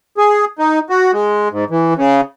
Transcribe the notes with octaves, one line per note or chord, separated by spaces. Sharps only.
G#4
D#4
F#4
G#3
G#2
E3
C#3